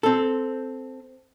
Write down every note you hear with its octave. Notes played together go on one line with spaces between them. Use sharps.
C4 A4